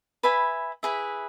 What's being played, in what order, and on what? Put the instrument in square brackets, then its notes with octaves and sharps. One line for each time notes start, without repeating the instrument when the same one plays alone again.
[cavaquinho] B4 E5 G#5 B5
E4 G#4 B4 E5